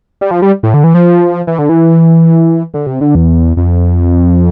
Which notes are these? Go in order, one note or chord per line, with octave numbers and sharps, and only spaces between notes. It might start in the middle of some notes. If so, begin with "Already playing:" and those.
G3
F3
G3
A2
D3
E3
F3
E3
D3
E3
D3
C3
D3
E2
F2